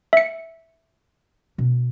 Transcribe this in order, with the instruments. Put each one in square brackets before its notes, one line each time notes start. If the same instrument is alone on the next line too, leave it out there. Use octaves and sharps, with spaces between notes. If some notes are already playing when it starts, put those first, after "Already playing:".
[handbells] E5 C#7
[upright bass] B2 D4